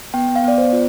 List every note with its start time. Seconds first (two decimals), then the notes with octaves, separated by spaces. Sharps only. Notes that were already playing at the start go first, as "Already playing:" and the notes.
0.14 B3 G5
0.36 F5
0.44 B3 D5
0.58 C5
0.73 F4